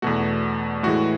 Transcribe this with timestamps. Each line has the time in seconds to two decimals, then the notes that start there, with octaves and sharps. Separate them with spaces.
0.02 E2 B2 A3 F#4
0.83 A2 E3 G#3 F#4